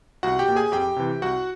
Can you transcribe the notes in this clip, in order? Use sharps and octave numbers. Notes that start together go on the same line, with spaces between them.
C2 F#4 F#5
G4 G5
A#2
G#4 G#5
F2 G4 G5
C3 E3
C2 F#4 F#5